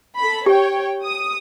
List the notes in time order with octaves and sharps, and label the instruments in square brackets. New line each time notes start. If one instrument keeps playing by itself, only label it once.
[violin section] A4 B5
[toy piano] G4 [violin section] C#5 G5
[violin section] D#6